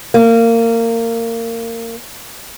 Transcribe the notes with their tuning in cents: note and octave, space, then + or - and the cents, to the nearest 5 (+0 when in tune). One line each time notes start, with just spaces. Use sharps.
A#3 -25